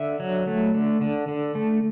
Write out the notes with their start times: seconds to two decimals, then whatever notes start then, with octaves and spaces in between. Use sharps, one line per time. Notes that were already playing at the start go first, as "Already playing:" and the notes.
Already playing: D3 E5
0.20 F#3
0.47 A3
0.74 D3
1.01 D3
1.28 D3
1.55 A3